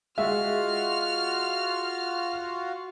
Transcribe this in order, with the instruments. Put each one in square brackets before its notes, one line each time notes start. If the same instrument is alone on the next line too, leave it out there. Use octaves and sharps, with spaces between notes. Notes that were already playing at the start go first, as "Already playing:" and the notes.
[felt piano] G#3 E5 [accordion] F4 F#4 [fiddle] F6